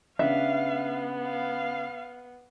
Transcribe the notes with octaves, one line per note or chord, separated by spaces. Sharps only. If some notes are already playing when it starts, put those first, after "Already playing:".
C#3 B3 D4 E5 F5
F5